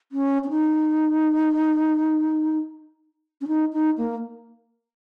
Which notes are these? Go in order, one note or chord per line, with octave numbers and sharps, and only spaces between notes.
C#4
C#4
D#4
C#4
D#4
D#4
A#3